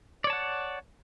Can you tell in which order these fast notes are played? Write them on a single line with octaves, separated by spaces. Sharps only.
D5 C#5 A5 F#5